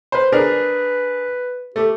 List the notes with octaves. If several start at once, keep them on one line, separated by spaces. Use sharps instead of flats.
B4 C5
D4 G#4 A#4 B4
A3 G4